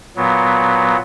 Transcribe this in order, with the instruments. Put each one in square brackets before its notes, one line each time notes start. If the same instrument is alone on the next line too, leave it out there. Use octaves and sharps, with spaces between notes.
[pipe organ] A#2 F#3 B3